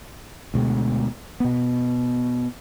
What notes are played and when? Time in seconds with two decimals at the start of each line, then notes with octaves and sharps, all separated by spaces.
0.54 D2 B2 G#3
1.40 B2 B3